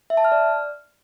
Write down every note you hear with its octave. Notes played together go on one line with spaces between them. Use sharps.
E5
A5
F6
D5